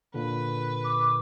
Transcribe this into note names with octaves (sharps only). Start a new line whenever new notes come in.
A#2 D3 B4
D6